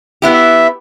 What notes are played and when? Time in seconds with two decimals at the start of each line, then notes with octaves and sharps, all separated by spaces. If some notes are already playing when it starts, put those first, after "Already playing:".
0.22 B3 E4 G4
0.34 E5